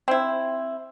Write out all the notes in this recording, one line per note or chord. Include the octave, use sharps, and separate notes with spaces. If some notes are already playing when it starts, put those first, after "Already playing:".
C4 E4